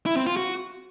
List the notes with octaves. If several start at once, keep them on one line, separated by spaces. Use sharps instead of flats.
E4
C4
F4
F#4